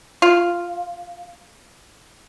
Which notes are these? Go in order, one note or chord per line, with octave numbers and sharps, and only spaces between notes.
F4